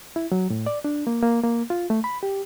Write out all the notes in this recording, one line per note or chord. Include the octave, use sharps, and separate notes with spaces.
E4
F#3
A2
D5
D4
A#3
A#3
A#3
F4
A3
B5
G4